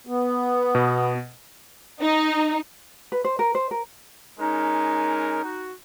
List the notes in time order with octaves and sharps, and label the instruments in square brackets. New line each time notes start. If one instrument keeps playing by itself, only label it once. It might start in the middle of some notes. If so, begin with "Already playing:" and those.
[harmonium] B3
[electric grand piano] B2
[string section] D#4
[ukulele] B4
C5
A#4
C5
A#4
[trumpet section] G#3 C#4 A#4 [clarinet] D#4
[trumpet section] F#4